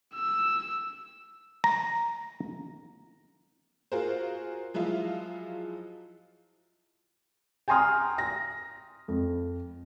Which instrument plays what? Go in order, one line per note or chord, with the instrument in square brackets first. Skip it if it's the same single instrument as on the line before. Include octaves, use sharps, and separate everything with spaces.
[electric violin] E6
[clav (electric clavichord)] A#5
[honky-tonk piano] F4 F#4 G#4 A#4 C5
F3 F#3 G#3 E4 F4
[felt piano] G5 G#5 A#5 C6 D#6 F6
A#6
F2